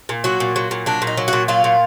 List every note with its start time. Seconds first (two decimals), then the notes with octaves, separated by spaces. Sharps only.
0.09 A#2
0.24 F#3 F#4
0.40 A#2
0.56 F#3
0.71 A#2
0.86 F#3 D4
1.02 A#2
1.07 D#4
1.17 F#3
1.28 A#2 F#4
1.48 F#3 F4
1.64 A#2